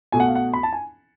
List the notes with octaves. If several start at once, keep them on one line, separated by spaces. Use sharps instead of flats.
B2 A3 G#5
F#5
F5
F#5
B5
A5
G#5